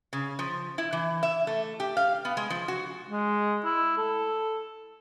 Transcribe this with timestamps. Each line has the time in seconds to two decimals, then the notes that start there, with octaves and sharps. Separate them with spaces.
0.13 C#3
0.39 F3
0.78 E4
0.93 E3
1.23 E5
1.47 A3
1.80 G4
1.97 F5
2.25 B3
2.37 G#3
2.50 F3
2.68 F#4
3.09 G#3
3.65 E4
3.98 A4